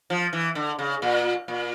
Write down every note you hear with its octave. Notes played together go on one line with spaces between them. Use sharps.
F3
E3
D3
C#3
A#2
A#2